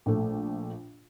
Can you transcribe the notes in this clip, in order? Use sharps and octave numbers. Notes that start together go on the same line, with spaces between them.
A#1 A3